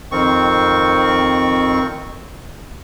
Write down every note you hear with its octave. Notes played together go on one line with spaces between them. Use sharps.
F2 D#3 C4 C#6